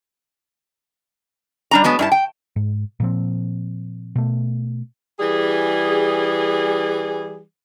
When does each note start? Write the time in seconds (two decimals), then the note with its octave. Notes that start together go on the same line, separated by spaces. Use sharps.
1.71 G3 D4 A#5
1.84 F#3 G#3 B3 A5
1.99 G2 E4 A5
2.12 G5
2.56 G#2
3.00 A#2 F3 C4
4.16 B2 A3
5.20 E3 G3 G#4